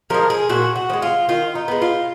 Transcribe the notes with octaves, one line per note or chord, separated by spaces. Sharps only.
F3 G#3 A#4
G#4
A#2 F#4
F#4
F3
G#3
F4
D#3 F4
D#4
G#3 B3
F4